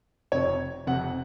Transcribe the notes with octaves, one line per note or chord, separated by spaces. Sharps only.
F1 F2 C3 C#5
F1 F2 C3 F#5